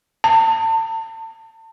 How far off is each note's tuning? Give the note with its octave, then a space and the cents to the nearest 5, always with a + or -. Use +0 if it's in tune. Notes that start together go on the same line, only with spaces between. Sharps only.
A5 +35